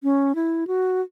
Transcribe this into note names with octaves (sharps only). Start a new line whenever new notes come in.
C#4
E4
F#4